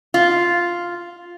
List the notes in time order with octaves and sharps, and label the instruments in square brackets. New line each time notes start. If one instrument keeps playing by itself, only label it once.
[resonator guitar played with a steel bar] F4